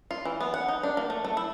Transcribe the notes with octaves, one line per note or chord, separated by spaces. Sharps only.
F4
E3
B3
F#5
D#4
D4
A#3
A3
A3
E4